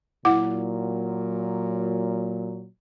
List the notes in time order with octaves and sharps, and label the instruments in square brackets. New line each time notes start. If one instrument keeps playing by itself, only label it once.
[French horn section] A#2 F#3 [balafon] E4 F#5 D6